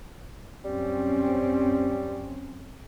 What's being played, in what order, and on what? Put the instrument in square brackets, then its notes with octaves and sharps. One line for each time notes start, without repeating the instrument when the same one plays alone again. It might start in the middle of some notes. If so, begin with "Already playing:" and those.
[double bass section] F#2 C4 C#4 [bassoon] G3